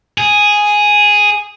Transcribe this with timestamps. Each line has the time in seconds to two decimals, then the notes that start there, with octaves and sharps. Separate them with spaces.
0.18 G#4